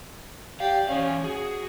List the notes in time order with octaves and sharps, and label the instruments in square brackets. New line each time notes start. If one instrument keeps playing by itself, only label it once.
[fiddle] G4 D5 [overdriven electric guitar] F5
[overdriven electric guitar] E3 F5 [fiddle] C#4
[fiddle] F#4 [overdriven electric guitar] G#4